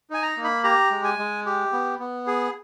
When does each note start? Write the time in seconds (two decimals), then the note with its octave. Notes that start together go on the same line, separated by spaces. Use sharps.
0.10 D#4 G#5
0.22 A#5
0.37 A#3
0.44 B5
0.64 G4 A#5
0.91 G#3
1.04 G#5
1.19 G#3
1.46 G4
1.72 B3
1.99 B3
2.27 G#4